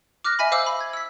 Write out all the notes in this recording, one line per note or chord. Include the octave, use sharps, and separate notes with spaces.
D6 F6 F#6 A#6
D#5 E5 G#5 B5
C5 F5 D6 E6
B5
G#6
E6 B6